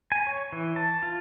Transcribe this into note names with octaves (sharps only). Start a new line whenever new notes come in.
G#5
C#5
E3
A5
F4